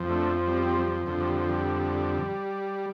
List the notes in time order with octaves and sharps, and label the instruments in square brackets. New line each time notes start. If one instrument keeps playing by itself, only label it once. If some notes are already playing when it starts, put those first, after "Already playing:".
Already playing: [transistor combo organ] F2 F3
A3 D4
G3 C4
G3 C4
G3
F3
F2 D3 F3
G3
F3
G3